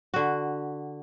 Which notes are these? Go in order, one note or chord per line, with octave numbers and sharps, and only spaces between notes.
D3 F#4